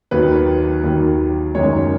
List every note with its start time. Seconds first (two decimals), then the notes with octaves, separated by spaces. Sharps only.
0.11 D#2 D#3 F#3 B4
0.84 D#2 D#3 F#3
1.55 F#1 F#2 D#3 G#3 C#5